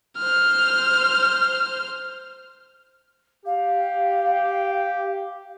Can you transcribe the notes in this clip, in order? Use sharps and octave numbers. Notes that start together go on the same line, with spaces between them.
C5 F6
G4 F5